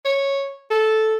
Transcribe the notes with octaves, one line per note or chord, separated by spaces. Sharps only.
C#5
A4